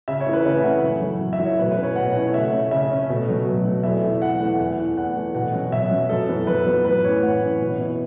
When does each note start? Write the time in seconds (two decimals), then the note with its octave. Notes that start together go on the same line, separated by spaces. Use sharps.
0.08 C#3 E5
0.20 C#5
0.26 E3 A3 C#4 E4
0.33 B4
0.45 C#3 E5
0.64 E3 A3 C#4 E4 F#5
0.83 F#2
1.02 F#3 A3 E4
1.21 F#2
1.33 E5
1.39 F#3 A3 E4
1.45 C#5
1.58 B2 B4
1.71 B4
1.77 A3 C#4 E4
1.83 C#5
1.96 B2 F#5
2.15 A3 C#4 E4
2.28 C#5
2.34 C#3 E5
2.52 A3 C#4
2.71 C#3 E5
2.90 A3 C#4
3.09 B2
3.28 F#3 A3
3.46 B2
3.65 F#3 A3
3.83 E2 E5
4.03 E3 A3 E4
4.22 E2 F#5
4.40 E3 A3 E4 F#5
4.59 E2 F#5
4.78 E3 A3
4.97 E2 F#5
5.16 E3 A3
5.35 B2 F#5
5.53 F#3 C#4
5.72 B2 E5
5.91 F#3 C#4
6.09 F#2 A4
6.29 F#3 B3 E4
6.47 F#2 B4
6.66 F#3 B3 E4
6.85 A2 B4
7.04 E3 C#4 C#5
7.23 A2 F#5
7.41 E3 C#4
7.61 B2
7.79 B3 E4